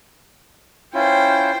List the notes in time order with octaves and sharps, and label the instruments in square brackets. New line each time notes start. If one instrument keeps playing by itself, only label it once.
[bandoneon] C#4 E4 F4 [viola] C5 G5